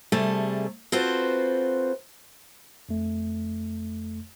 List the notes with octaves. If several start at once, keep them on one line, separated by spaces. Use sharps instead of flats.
C3 G3 A3 G#4 A4
C4 F4 F#4 A4 B4 C5
F2 A3